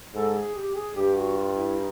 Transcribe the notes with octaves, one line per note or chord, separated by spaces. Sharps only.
G#2 A4
G#4
G4
G#4
G2 G4
F#4
F4
E4
D#4